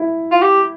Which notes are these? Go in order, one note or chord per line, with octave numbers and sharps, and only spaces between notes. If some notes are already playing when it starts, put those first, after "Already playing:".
Already playing: E4
F4
G4